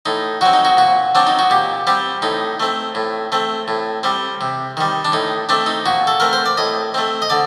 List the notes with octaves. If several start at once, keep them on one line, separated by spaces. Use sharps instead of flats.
A2 D#4
F#3 C4 F#4
D#4
F#4
A#2 F#4
F#3 C4 D4
D#4
F#4
A#2 G4
G3 C4 G4
A2 D#4
A3 C4
A2
A3 C4
A2
G3 C4
C3
D#3 G3
D4
A2 D#4
A3 C4 D4
D#4
A#2 F#4
A4
A3 C4 A#4
C5
D5
A2 D#5
A3 C4
D#5
D3 D5